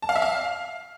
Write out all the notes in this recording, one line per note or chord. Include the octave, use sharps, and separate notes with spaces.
A5
F5
E5
F5